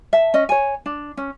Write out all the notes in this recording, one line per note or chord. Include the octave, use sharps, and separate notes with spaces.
E5 A5
C#4 D#5
C#5 G#5
D4
C#4